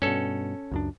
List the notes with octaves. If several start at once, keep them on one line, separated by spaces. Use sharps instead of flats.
G2 B2 C#4 A4
C#2 F#2 D4